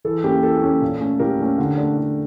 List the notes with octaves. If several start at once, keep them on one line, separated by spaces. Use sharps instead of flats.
E3 A4
A#3 C#4 G4
E3 A4
A#3 C#4
A#2
A3 C#4
A#2 G4 A#4
A3 C#4
D3
A3 D4
D3